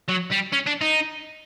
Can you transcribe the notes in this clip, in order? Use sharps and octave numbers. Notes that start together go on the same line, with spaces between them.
F#3
G3
C#4
D4
D#4